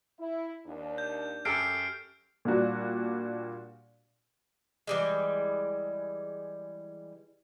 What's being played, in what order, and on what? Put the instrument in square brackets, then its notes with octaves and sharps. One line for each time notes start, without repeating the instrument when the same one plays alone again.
[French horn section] E4
D#2 D4
[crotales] G6
[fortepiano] F#2 G4 A4 [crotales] F6 C7 D7
[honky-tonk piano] A#2 G3 D4 F#4
[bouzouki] E3 G3 G#3